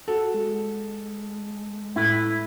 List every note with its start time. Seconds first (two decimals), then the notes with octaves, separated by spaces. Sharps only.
0.08 F#4 A4
0.34 G#3
1.96 A2 E4 B4